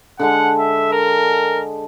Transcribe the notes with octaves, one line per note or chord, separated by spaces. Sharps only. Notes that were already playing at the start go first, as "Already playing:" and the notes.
D3 G#3 F#5 A5
E5
A#4